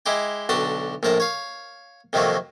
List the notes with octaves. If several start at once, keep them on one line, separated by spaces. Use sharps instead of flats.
G#3 E4 G4 G5
B1 D3 F#4 G4 A5
A#1 A2 A#4 A5
C#5 F5
F2 C3 D#3 F#3 A3 A#3